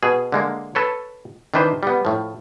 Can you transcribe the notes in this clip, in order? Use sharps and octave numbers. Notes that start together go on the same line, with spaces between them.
B2 G#4
D3 G#3 A#3
A4 B4 C#5
D#3 E3 D4 B4 C5
G3 B3
A2 F3